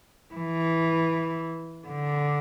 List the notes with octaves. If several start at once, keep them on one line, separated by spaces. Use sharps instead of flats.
E3
D3